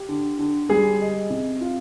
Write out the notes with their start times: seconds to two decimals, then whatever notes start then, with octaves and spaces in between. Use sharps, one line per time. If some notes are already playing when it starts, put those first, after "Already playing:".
Already playing: G4
0.09 D3
0.39 D3
0.69 G3 G#4
1.00 D#5
1.30 C3
1.61 F4